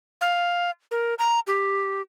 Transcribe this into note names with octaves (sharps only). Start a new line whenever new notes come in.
F5
A#4
A#5
G4